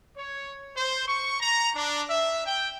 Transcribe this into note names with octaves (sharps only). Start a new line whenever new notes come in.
C#5
C5
C#6
A#5
D4
E5
G5